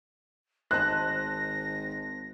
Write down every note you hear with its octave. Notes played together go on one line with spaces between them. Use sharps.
G#1 C5 D#5 A5 F#6 A#6